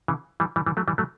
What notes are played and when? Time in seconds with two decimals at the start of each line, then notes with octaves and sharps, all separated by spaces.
0.08 C#3 E3
0.40 E3 G3
0.56 E3 G3
0.66 E3 G3
0.77 F#3 A3
0.88 E3 G3
0.98 F#3 A3